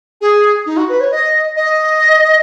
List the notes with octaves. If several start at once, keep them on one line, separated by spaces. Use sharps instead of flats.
G#4
D#4
F#4
B4
C#5
D#5
D#5